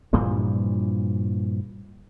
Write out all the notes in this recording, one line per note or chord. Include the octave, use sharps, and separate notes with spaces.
G2 A#2 E3 F3